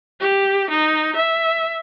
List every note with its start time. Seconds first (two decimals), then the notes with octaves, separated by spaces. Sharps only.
0.20 G4
0.70 D#4
1.16 E5